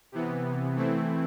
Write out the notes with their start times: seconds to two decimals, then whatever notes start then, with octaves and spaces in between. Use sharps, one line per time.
0.12 C3 E3 B3
0.76 E3 A3 C4 E4